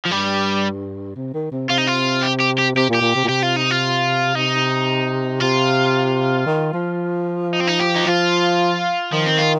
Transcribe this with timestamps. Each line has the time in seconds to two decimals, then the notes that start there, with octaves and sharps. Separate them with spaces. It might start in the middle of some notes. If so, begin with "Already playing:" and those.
0.05 F3
0.10 G2 G3
1.16 C3
1.34 D#3
1.52 C3
1.69 C3 F4
1.78 D#4
1.87 F4
2.23 G4
2.40 G4
2.58 G4
2.75 C3 G4
2.89 A#2
2.94 G4
3.02 A#2
3.16 C3
3.25 A#2
3.28 C3 G4
3.43 F4
3.56 D#4
3.71 F4
4.35 C3 D#4
5.41 C3 F4
6.46 D#3
6.74 F3
7.53 D#4
7.60 C4
7.67 D#4
7.80 G4
7.95 D#4
8.06 F3 F4
9.12 D#3 F3
9.26 C4
9.38 F4